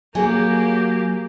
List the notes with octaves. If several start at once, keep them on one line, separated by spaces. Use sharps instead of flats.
F#3 A#3 G4 G#4 G#5